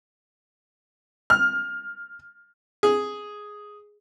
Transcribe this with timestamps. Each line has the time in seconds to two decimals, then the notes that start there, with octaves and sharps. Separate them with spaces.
1.30 F6
2.83 G#4